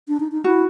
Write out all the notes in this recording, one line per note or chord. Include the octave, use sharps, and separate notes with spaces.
D4
D#4
D#4
E4 F#4